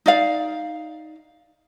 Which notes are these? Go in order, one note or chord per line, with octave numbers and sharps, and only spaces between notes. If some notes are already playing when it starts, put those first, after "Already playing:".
D#4 D5 F5